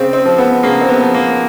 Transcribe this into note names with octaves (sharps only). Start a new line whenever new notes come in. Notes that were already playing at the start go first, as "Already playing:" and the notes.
Already playing: C#3 C4
C4
F3
B3
C#3 A#3
C4
B3
F3
A#3